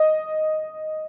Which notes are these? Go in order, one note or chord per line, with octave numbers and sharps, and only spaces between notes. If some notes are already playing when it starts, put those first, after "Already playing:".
Already playing: D#5